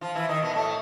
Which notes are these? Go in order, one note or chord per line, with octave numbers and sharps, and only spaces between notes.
F3 F4
E3 E4
D#3 D#4
B2 B3
A2 A3